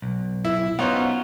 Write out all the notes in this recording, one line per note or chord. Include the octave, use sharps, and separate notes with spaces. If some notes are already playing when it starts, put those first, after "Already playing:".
B1
E4
B3 C#4 D#4 F4 F#4 C5